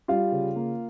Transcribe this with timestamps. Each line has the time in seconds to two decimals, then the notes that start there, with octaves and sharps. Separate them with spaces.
0.08 G3 F4 F5
0.32 C#3
0.56 A#3